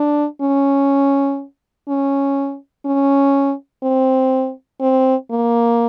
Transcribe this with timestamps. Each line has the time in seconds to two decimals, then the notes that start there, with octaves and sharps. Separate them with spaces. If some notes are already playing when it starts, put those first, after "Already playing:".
Already playing: D4
0.41 C#4
1.88 C#4
2.86 C#4
3.83 C4
4.81 C4
5.31 A#3